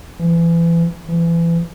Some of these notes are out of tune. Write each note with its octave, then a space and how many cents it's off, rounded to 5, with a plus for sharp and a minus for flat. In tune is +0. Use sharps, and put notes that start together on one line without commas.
E3 +30
E3 +30